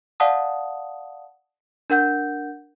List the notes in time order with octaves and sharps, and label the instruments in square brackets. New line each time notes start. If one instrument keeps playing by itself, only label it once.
[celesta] D5 F5 F#5 A5 D#6
D4 A#4 F#5 G6